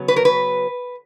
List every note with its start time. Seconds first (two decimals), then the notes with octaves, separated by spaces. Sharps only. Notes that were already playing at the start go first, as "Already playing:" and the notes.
Already playing: C#3 F#3 B3
0.08 B4
0.16 A#4
0.25 B4